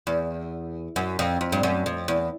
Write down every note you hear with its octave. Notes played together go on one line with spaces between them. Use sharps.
E2
F#2
F2
F2
G2
F#2
F2
E2